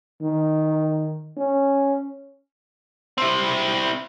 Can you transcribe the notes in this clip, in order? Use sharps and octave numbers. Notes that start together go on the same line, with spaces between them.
D#3
C#4
C4 E4